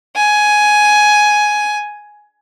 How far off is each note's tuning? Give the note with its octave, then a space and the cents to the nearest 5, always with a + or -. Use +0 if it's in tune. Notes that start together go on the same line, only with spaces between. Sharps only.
G#5 +10